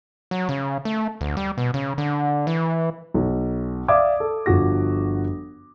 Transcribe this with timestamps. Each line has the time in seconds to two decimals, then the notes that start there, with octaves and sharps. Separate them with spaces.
0.31 F#3
0.49 C#3
0.85 A3
1.21 D2
1.37 G3
1.58 B2
1.74 C#3
1.98 D3
2.47 E3
3.14 B1
3.88 D5 E5 F5 D6 D#6 G#6
4.20 A4
4.46 G1 F3 F#4 A#6